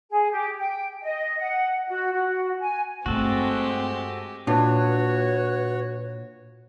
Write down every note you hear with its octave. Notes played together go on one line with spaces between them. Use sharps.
G#4
G4
G5
D#5
F#5
F#4
F#4
G#5
G2 G#3 A3 C4 F#4 G4 A4
A#2 D4 F#4 B4 C#5